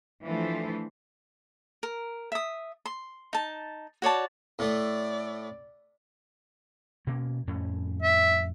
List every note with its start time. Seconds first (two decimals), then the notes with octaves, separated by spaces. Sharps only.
0.24 E3 F3 A3 D4 A4 C5
1.83 A#4
2.32 E5 D#6
2.85 C6
3.33 D#4 A5
4.02 F#4 C#5 D5 A5
4.59 A2 A3 D5
7.07 B2 A#3 C#4
7.47 F2 A2 C#4
8.02 E5